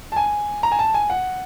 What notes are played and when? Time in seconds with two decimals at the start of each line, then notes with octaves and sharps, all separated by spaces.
0.12 A5
0.16 G#5
0.63 A#5
0.72 G#5
0.79 A5
0.94 G#5
1.10 F#5